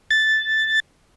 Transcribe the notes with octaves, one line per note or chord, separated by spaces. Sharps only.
A6